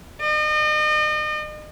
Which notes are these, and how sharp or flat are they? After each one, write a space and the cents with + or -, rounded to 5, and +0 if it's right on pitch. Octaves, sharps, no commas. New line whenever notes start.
D#5 -40